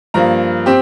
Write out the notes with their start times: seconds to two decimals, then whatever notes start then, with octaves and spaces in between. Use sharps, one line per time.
0.14 G2 F3 A#3 A#5
0.66 C4 G4